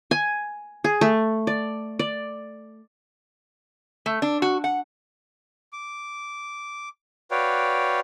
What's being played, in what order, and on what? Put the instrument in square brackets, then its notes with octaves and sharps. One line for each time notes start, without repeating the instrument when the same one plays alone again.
[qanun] G#5
G#4
A3
D5
D5
[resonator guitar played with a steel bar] A3
D4
F#4
F#5
[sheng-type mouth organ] D6
F#4 B4 C#5 D5 F5 G5